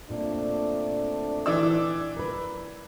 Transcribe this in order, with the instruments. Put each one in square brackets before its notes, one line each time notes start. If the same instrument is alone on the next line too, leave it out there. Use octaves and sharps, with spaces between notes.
[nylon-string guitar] A#2 [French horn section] A3 C4 D4
[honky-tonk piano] E3 D5 E6
[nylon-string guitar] A#4 B4